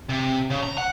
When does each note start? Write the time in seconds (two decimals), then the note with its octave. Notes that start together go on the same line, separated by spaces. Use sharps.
0.09 C3
0.50 C#3
0.63 A#5
0.78 F#5